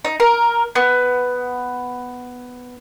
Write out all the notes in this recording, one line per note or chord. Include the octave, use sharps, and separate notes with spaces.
D#4
A#4
B3